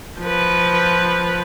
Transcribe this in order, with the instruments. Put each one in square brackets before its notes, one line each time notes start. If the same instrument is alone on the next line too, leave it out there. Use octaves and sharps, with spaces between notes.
[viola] F3 B4